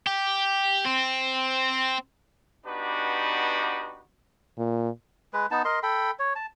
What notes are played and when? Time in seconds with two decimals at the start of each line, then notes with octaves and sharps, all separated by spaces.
0.06 G4
0.85 C4
2.65 B3 D4 D#4 F#4 G4 B4
4.58 A#2
5.33 G#3 B4
5.51 B3 D#4 A5
5.65 A#4 D#5 C6
5.83 A4 G5 B5
6.19 C#5
6.36 A5